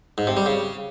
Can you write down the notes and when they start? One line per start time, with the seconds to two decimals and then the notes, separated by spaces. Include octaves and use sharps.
0.18 G#2
0.27 C3
0.37 G3
0.46 C#3